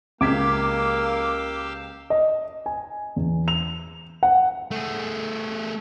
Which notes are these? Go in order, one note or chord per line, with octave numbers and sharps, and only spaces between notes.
C#2 A#3 G4 F5 D6 E6 G#6 B6
D#5
G#5
E2
F7
F#5
A3 G#4